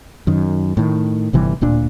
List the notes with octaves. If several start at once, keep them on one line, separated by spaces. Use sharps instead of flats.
F#2 D#3
A2 D#3
G1 C3 E3 G3
D1 A#2 D4